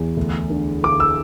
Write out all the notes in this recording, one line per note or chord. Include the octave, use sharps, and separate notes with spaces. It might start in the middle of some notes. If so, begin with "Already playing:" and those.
Already playing: E2
D2
D3
D3 D6
E6